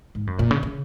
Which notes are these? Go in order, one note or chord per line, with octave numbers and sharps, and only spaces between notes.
G#2
F#2
A#2
C#3
C#3